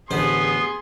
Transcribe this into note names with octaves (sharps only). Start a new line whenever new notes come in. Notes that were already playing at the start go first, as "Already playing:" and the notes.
A1 D3 B3 G#4 C5 C6